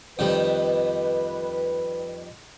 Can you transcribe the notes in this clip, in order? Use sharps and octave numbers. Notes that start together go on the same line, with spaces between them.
F2 D#3 G3 B4